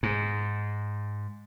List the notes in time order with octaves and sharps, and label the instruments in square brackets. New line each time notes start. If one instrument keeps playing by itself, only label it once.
[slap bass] G#2